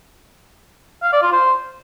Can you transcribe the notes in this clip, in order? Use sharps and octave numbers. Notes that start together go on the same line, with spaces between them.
F5
D5
F4
C5